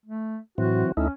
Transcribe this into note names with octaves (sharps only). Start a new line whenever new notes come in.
A3
A2 E3 F#3 C4 F#4
D2 A3 C#4 D#4 E4